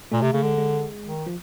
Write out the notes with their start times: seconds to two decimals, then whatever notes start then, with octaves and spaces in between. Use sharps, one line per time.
0.12 A#2 A3
0.22 C3
0.33 C#3 A3
0.43 D3 G#3
0.58 G#3
1.04 D#3
1.27 F3